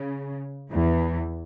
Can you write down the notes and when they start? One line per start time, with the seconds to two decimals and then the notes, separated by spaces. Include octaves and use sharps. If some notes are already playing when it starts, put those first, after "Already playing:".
Already playing: C#3
0.71 E2 E3